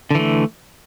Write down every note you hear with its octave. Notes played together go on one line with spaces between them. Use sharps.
D3 E3 A3